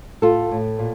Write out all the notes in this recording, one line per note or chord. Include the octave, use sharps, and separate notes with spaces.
A2 F4 A4
A2
A#2